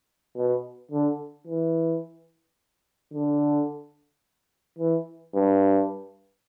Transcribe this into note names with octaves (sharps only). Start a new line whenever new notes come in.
B2
D3
E3
D3
E3
G2